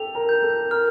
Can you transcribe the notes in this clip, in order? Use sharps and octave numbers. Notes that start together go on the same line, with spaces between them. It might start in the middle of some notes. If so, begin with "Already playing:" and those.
Already playing: G4 A4 F7
A#4
G6
A4
A#4 F6